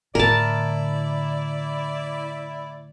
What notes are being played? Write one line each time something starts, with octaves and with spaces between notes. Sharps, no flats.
A2 D3 E4 A#4 D5 A5